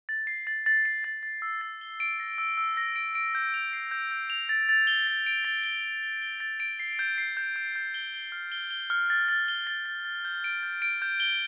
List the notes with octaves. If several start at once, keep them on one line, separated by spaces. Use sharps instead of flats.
A6
C7
A6
A6
C7
A6
A6
E6
A6
G7
D7
A#6
E6
E6
A#6
D7
D7
G6
F7
C7
G6
G6
F7
A6
A6
G7
A6
D7
A6
G7
G7
G7
G7
A6
D7
C7
G6
C7
G6
G6
G6
G7
G7
F6
G7
G7
F6
A6
A6
G7
A6
A6
A6
G6
D7
G6
D7
G6
G7